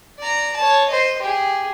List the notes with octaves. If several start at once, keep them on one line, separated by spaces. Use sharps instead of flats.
D5 A#5
C#5 A5
C5 D#5
G4 G#4